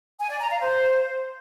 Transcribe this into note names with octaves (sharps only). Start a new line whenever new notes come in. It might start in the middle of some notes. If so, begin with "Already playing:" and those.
G#5
D5
A#5
F5
C5